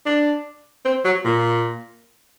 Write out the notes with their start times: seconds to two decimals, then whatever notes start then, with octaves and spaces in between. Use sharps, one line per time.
0.06 D4
0.85 C4
1.04 F#3
1.24 A#2